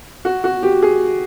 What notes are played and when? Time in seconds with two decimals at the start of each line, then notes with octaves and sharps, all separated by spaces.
0.25 F#4
0.44 F#4
0.63 G4
0.82 G#4